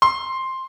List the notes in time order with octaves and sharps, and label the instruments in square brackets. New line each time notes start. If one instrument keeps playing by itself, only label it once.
[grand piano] C6